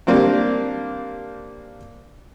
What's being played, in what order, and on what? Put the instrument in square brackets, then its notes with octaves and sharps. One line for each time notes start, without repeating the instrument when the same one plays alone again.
[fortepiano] G3 A#3 C4 D4